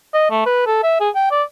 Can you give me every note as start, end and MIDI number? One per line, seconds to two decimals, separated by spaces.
0.13 0.29 75
0.31 0.41 57
0.46 0.62 71
0.66 0.79 69
0.83 0.98 76
1.00 1.10 68
1.15 1.31 79
1.31 1.43 74